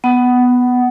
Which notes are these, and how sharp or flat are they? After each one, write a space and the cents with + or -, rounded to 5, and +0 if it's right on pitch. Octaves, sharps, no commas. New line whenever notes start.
B3 +0 F#5 +20